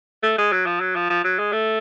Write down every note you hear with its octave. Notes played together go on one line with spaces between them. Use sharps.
A3
G#3
F#3
F3
F#3
F3
F3
F#3
G#3
A3